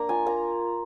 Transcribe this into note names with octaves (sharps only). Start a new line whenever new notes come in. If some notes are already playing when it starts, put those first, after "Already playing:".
Already playing: A#3 D4 A#5
F4 G#5
A#3 A#5